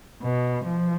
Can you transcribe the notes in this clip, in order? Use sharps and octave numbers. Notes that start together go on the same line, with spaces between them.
B2
F3